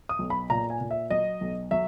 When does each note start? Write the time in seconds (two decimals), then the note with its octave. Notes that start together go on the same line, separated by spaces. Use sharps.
0.09 D#6
0.19 B1
0.30 B5
0.50 A#2 A#5
0.70 G#5
0.81 A#2
0.91 E5
1.10 F#3 D#5
1.41 B1
1.71 F#3 E5